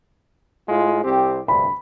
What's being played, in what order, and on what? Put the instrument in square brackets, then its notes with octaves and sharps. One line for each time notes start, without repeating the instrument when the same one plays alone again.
[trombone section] A2 G#3 F4
C2 C4 G4
[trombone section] D2 G2 C3 [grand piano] B5